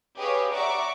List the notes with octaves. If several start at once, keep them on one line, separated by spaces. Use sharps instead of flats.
G4 G#4 B4 C#5 D#5 F5
D5 E5 F#5 A#5 C#6 D6